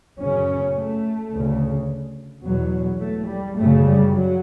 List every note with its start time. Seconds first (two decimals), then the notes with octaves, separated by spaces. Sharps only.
0.19 F#2 C#3 C#4
0.76 A3
1.31 D2 C#3
2.43 E2 B2 F#3
3.00 A3
3.28 G3
3.56 F#2 C#3 A3
3.84 G3
4.12 F#3